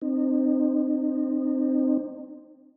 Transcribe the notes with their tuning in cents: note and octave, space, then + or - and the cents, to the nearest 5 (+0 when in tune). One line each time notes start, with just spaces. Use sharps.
C4 +0 D#4 -35